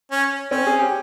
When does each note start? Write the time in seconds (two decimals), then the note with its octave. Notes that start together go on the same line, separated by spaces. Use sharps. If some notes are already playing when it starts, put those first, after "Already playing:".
0.11 C#4
0.51 C4 C#4
0.67 G#4
0.79 G4